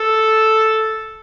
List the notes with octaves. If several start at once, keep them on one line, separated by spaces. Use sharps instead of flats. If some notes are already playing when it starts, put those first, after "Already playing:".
Already playing: A4